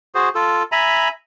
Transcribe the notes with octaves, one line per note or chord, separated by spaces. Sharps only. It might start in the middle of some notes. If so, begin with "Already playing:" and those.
F#4 G#4 C5
F4 A4
E5 G#5 A#5 B5